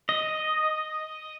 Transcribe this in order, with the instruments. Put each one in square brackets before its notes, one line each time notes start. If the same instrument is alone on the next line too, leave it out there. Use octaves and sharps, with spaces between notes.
[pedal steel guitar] D#5